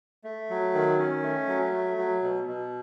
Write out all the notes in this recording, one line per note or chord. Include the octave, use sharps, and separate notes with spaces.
A3
F#3
D#3
C#4
A3
F#3
A3
F#3
B2
B2